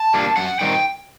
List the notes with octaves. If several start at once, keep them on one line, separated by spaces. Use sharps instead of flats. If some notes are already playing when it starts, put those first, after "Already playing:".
Already playing: A5
G3 A#3 D4
F#2 F#5
D#3 G3 C4 D#4 G5